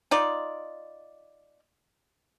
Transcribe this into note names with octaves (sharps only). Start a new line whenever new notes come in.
D#4 F4 D5